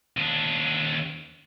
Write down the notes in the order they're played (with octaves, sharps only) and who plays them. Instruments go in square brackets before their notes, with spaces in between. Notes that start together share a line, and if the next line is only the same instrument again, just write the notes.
[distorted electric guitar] D#2 D4